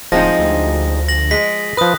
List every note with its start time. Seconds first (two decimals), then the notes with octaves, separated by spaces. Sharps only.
0.12 D1 F3 G#3 C4 D#4 A#6
0.39 D2
1.09 A#6 F#7
1.31 G#3 B6
1.77 F3 B4 D#6 F#6